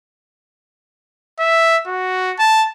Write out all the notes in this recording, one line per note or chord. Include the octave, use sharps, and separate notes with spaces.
E5
F#4
A5